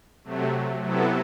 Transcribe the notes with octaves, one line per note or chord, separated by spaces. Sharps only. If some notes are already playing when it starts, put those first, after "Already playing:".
C3 F#3 A3
C3 F#3 B3 E4 A4